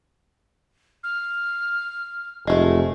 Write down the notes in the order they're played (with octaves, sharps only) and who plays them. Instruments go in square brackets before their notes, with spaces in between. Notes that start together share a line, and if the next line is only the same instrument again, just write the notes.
[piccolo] F6
[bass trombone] F1 [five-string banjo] G#3 A3